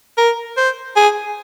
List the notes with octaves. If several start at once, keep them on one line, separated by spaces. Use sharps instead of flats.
A#4
C5
G#4